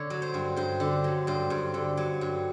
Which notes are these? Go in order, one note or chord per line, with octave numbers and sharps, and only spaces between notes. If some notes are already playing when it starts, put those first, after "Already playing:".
Already playing: D3 C#5
F#3
C5
G2
G2 C5
D3
F#3
G2 C5
G2
D3
F#3
G2